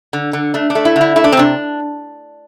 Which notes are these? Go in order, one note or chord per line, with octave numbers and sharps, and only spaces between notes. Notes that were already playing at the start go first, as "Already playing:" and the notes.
D3
D3
A3 D4
D4
A3
E4
D3
E4
A3 E4
D4
C4
C3 D4